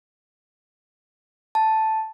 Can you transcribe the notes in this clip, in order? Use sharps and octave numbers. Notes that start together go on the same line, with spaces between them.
A5